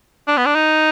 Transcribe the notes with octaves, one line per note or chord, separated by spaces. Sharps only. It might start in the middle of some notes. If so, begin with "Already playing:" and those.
D4
B3
D4
D#4